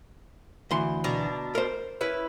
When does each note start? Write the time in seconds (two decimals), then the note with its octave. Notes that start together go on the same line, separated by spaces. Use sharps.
0.71 D2 E3 C6
1.04 B2 D4 A#5
1.55 A#4 C5
2.01 C#4 E4 B4